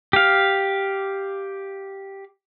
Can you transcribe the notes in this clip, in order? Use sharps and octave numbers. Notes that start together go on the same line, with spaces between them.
G4 F5